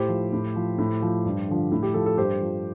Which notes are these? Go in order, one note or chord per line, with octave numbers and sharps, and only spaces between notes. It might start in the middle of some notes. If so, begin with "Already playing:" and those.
Already playing: A2 G4 C5
F3
A2
F3
A2
F3
G2
D3 F3
A2
G4
F3 A4
A4
G2 G4 C5
F3